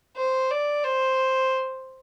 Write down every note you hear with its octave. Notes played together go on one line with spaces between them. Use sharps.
C5
D5
C5